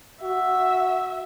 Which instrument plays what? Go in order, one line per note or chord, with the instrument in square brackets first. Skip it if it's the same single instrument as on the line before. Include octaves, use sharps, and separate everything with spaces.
[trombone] F#4 [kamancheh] E5